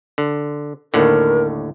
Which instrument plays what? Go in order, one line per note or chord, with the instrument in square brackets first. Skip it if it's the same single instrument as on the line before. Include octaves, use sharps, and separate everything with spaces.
[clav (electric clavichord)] D3
[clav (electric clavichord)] D#2 A2 D3 [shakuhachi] A#4